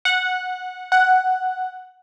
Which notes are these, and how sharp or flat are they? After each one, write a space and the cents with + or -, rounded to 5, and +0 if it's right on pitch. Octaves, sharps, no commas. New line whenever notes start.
F#5 -15
F#5 +0